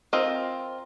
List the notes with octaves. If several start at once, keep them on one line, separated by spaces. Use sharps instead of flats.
C4 F4 A#4 D#5